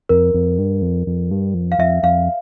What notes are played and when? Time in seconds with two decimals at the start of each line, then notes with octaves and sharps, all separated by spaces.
0.09 F2 A#4
0.34 F2
0.59 G2
0.82 F2
1.07 F2
1.31 G2
1.54 F2
1.72 F5
1.79 F2 E5
2.03 F2 F5